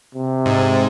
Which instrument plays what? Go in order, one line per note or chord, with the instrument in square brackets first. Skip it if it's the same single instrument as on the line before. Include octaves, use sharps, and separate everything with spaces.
[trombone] C3
[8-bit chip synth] G#2